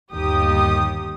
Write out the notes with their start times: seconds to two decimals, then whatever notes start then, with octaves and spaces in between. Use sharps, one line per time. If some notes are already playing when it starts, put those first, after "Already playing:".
0.13 G1 D#2 D#3 G4 D#6